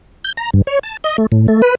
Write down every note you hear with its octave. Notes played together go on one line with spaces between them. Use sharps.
G6
A#5
G2
C#5
A5
D#5
A3
A2
A3
B4